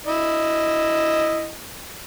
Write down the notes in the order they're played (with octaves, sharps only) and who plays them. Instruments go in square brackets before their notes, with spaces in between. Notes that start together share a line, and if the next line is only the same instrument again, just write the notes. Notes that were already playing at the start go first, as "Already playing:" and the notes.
[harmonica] E4 D#5